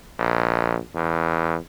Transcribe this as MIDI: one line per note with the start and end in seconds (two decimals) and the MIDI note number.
0.19 0.78 34
0.95 1.57 40